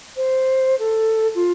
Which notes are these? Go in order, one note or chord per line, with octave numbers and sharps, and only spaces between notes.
C5
A4
F4